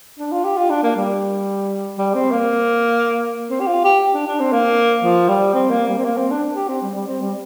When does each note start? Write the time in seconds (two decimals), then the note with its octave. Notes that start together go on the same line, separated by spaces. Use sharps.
0.19 D4
0.32 F4
0.44 G4
0.57 F4
0.70 D4
0.83 A#3
0.96 G3
1.98 G3
2.14 C4
2.32 A#3
3.50 C4
3.61 G4
3.67 F4
3.84 G4
4.14 D4
4.27 D4
4.40 C4
4.52 A#3
5.03 F3
5.28 G3
5.54 C4
5.70 A#3
5.88 G3
5.98 C4
6.05 A#3
6.18 C4
6.31 D4
6.56 G4
6.68 C4
6.82 G3
6.94 G3
7.07 C4
7.21 G3